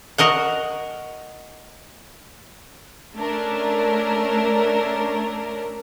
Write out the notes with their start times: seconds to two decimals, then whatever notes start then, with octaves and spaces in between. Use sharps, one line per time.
0.18 F#4 A#4 D#5 F#5
3.15 A3 C#4 D4 A#4